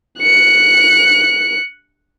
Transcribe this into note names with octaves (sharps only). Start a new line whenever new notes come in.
F#6 C#7